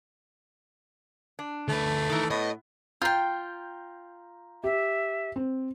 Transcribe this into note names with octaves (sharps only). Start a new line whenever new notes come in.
D4
D2 A3 B4
D#3 E3 A4 A#4
A2 B3 D#5
F4 G5 A#5 G6
G4 E5
C4